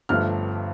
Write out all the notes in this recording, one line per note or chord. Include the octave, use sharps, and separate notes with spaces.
G1 G2 F3 A3 F6